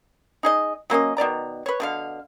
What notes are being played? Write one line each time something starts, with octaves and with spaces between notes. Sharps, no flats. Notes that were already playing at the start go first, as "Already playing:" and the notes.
D#4 G#4 D#5
F#3 A#3 C#4 D#5
B2 D#3 D5 A#5
B4 C#5
B2 D3 F5